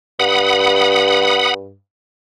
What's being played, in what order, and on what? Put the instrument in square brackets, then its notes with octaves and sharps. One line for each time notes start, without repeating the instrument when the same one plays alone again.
[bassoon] G2 [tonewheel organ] F#5 B5 D#6